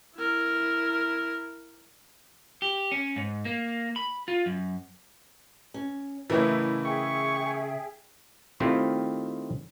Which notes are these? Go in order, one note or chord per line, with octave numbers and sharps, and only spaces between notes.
E4 A#4
G4
C#4
G#2
A#3
B5
F4
F#2
C#4
A2 C#3 E3 E4 A#4 D#5
G#4 E5 G5 C#6
D#3 A3 C4 E4 F4 G4